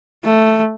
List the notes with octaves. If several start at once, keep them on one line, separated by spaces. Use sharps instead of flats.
A3